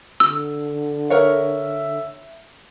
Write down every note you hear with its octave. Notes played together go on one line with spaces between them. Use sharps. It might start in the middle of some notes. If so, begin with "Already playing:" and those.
D3 E6
A#4 C#5 E5 F#5